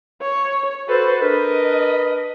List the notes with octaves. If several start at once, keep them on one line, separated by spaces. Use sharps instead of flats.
C#5
F#4 A4 B4 C5
D4 A#4 B4 D#5